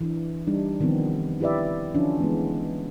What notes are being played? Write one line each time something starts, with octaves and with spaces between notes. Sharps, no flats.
E3 D4
G3 D4 D#4
C3 D#3 F3 B3 C4
E4 G4 B4 D5 E5
D3 E3 F3 C#4 D4 F4
E3 G#3 A#3 B3